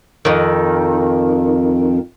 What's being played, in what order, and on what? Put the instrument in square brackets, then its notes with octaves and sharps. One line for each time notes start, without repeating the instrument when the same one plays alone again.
[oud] F2 D#3